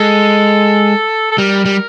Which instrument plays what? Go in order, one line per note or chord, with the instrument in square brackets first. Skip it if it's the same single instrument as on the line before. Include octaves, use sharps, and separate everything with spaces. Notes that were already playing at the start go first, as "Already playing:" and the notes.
Already playing: [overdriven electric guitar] G#3 [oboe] A4
[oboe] A4
[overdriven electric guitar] G3 [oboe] A#4
[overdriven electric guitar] G3